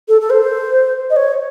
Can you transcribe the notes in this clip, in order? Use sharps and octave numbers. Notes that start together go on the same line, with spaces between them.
A4
A4
C5
D#5
C#5